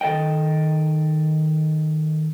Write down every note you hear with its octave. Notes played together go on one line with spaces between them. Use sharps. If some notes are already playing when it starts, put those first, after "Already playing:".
D#3 A4 C5 D#5 G5